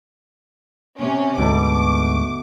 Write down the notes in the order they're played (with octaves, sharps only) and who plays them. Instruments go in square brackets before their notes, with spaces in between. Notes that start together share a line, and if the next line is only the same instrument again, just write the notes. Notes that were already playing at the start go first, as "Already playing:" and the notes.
[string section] C3 C#4
[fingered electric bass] D2 G#2 [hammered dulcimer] B2 A3 [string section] D6